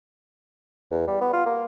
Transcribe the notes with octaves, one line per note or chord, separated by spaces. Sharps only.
E2
G3
B3
F4
A#3